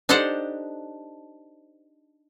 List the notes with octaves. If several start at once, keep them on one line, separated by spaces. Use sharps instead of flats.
D4 D#4 G4 A4 C5 F#5